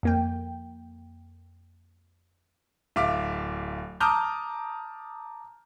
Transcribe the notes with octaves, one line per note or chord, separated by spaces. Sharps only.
F2 A#3 G5
D1 E5 F5 D6
A5 A#5 D6 D#6 F6 G6